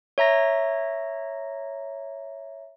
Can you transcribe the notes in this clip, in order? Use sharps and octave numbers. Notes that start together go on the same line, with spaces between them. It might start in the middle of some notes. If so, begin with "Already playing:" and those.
C#5 E5 A#5 A#6